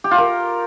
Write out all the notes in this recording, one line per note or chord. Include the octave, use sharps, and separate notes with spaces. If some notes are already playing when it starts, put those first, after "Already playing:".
G4
F4
A#4